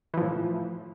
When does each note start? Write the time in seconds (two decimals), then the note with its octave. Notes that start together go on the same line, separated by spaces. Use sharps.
0.14 E3
0.17 F3
0.21 A2